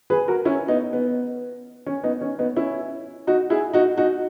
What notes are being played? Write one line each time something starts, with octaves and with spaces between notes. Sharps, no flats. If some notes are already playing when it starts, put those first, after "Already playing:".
G#4 B4
F#4 A#4
C#4 E4
B3 D#4
B3
C#4
B3 D#4
C#4
B3 D#4
C#4 E4
D#4 F#4
E4 G#4
D#4 F#4
D#4 F#4